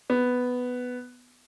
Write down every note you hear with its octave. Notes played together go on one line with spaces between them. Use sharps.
B3